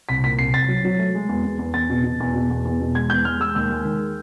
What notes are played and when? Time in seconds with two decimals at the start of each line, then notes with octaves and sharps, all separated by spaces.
0.09 C2 B6
0.24 A#2 B6
0.38 C2 C7
0.54 C2 A6
0.68 F#3
0.85 F#3
0.99 A3
1.15 G#3
1.29 E2
1.44 E2
1.59 E2
1.74 E2 A6
1.90 B2
2.04 B2
2.20 E2
2.34 B2
2.50 E2
2.65 E2
2.81 B2
2.95 G#3 G#6
3.10 E2 G6
3.25 G#3 F6
3.40 G#3 E6
3.55 D#2 E6
3.71 G#3
3.85 D#3